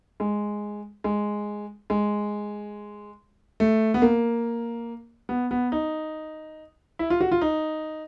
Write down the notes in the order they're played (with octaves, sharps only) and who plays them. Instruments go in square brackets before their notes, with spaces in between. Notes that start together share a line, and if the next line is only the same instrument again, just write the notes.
[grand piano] G#3
G#3
G#3
A3
B3
A#3
B3
B3
D#4
E4
F4
F#4
F4
D#4